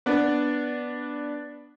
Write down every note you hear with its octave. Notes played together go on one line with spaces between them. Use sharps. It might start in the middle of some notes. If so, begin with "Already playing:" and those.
B3 D4